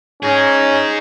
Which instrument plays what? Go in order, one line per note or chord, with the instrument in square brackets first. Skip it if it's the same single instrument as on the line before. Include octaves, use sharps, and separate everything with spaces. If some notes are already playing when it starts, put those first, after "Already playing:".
[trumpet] C#4 [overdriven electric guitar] D#4 G#4